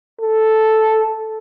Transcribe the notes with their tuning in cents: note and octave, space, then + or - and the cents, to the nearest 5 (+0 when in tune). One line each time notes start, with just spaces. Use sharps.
A4 -5